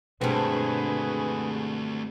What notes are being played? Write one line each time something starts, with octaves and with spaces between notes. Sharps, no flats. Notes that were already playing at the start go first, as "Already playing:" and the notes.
G2 B2 G#3 A3 C4 F#4 G#4 B4